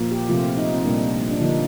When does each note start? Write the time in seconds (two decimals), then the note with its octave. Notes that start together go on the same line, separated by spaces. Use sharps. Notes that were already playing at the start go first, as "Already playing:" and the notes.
Already playing: A#2 F3 A#3
0.11 G4
0.29 C3 F3 A3 F4
0.57 D#4
0.73 C4
0.85 A#2 G3 A#3 D4
1.31 D4
1.41 D3 F3 A#3 D#4